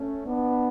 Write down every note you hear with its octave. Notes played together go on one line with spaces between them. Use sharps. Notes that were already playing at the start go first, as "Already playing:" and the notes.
Already playing: A3 C#4
B3 D4